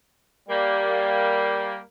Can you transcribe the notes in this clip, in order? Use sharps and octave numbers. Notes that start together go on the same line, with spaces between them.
G3 A#3